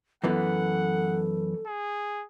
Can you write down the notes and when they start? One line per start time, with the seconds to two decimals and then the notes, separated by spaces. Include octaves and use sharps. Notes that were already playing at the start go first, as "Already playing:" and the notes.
0.24 F#2 E3 B3 A4 F#5
1.67 G#4